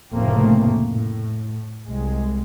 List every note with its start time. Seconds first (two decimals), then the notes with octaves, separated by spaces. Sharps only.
0.14 F1 A2 C#3 A3 A#3 C4
0.91 A2
1.88 C2 G#3